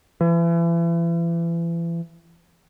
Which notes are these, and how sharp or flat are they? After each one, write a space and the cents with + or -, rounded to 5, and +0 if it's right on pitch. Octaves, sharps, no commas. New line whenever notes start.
E3 +35